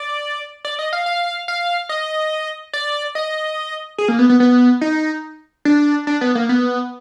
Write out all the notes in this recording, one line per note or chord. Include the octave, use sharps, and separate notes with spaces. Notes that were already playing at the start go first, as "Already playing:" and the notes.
Already playing: D5
D5
D#5
F5
F5
F5
D#5
D5
D#5
G#4
A#3
B3
B3
B3
D#4
D4
D4
B3
A#3
B3